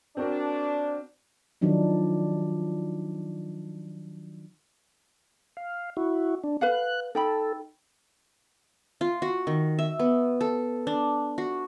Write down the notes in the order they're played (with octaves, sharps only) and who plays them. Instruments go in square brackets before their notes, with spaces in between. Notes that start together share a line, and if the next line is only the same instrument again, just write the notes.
[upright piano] C4 F#4 A#4 [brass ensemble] D4
[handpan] D#3 F3 F#3 D4 D#4
[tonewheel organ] F5
E4 F#4
D4
[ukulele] B4 F5 F#5 [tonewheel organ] F#6
[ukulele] D#4 G5 B5 [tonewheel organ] A4
[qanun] F4
F#4
D#3
E5
B3
A4
D4
F#4